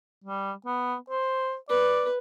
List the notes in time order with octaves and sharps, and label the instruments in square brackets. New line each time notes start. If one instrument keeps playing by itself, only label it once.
[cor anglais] G3
B3
C5
[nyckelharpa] B4 [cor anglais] D5